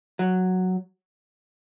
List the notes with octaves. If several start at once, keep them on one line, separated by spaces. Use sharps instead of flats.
F#3